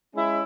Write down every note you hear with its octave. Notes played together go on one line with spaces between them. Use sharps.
G#3 C#4 E4